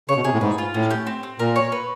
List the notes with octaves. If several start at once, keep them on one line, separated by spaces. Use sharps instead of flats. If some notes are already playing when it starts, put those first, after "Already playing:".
C#3 C#5
B2
C3 G#4
A2
G#2 B4
F4
A2 C#4
G4
C4
C4
A#2 A#4
C#5
B4